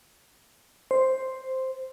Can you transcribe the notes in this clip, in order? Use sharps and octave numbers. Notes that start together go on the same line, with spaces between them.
C5